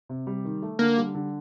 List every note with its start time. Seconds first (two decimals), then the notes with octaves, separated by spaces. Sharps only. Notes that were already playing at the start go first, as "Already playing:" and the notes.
0.09 C3
0.27 G3
0.45 D#3
0.62 A3
0.79 D3 A#3
0.97 G3
1.15 D3